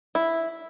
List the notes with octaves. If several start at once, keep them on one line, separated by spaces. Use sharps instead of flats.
E4